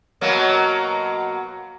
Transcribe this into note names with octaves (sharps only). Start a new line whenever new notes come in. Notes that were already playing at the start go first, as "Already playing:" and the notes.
B2 F#3 A#3